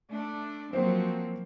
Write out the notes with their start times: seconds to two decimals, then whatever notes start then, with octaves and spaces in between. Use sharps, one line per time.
0.12 A3 D4
0.73 F3 F#3 A#3 C4 C5